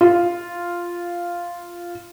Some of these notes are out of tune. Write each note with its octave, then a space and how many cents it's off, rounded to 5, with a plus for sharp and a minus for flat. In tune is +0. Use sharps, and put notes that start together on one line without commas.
F4 -5